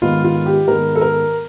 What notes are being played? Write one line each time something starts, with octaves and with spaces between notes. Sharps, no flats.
G#2 D#3 G#3 B3 F4
F4
G4
G#2 D#3 G#3 B3 A#4
A4
A#4